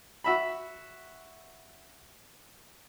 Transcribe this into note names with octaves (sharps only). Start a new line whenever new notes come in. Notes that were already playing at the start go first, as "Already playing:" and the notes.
F#4 E5 B5